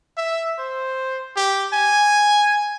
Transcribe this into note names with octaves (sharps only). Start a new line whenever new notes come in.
E5
C5
G4
G#5